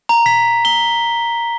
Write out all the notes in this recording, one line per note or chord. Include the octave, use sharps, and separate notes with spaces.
A#5
B6
G7